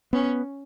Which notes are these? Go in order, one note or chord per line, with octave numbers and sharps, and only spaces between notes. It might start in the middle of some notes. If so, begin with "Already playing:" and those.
B3 C#4